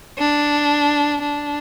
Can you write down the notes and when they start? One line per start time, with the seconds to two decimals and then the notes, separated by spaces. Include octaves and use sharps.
0.18 D4
1.22 D4